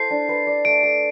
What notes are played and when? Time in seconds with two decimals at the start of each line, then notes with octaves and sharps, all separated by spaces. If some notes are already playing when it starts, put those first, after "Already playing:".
Already playing: E4 A4 C5 C7
0.10 D4
0.29 B4
0.47 D5
0.65 A3 D7
0.83 A4